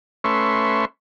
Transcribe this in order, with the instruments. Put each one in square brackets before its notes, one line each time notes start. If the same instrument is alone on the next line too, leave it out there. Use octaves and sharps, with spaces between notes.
[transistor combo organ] A3 C#4 B4 E5 C6 C#6